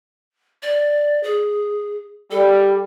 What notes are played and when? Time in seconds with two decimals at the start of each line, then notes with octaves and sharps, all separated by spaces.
0.63 D5
1.23 G#4
2.31 G3 A4